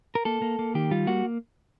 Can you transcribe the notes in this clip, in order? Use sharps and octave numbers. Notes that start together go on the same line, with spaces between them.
A#4
A#3 A4
A#3
A#3
D#3 G4
G3 F4
A#3 F#4